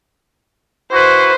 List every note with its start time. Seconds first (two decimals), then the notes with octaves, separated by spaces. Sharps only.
0.92 E4 F#4 B4 C5